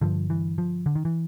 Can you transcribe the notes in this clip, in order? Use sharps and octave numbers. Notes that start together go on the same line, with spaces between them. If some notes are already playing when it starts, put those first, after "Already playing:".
G2 D3 F3
E3
F3
D3
D#3
E3